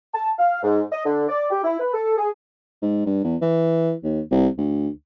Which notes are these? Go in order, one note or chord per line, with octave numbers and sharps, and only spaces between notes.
A5
F5
G#2
D#5
D3
D5
G4
E4
B4
A4
G#4
G#2
G2
E2
E3
D#2
C2
D2